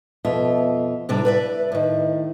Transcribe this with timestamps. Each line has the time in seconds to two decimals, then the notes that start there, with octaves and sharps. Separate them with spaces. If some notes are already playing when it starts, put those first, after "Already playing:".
0.25 F2 B2 F4 E5
1.09 A2 C3 G3 D4
1.25 B4 D5 E5
1.72 A2 D#3